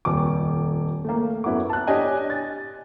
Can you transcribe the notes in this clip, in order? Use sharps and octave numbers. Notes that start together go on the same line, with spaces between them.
D#1 F2 D6
A3 A#3
F#2 B3 E4 F#5 D6
A5 F#6
D4 G4 C#5 D#5 G#5
A6